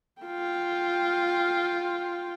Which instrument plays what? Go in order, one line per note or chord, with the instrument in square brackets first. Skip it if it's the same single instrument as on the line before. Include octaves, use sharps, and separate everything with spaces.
[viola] F4 G5